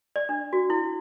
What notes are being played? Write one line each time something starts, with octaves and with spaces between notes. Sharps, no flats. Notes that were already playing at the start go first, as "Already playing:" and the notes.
D5
D4
F#4
E4